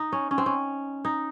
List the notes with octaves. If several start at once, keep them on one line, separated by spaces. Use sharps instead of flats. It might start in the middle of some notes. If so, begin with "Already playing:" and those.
Already playing: D#4
C#4
C#4
C4
C#4
D#4